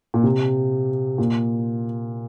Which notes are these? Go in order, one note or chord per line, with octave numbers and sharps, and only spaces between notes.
A#2
C3
A#2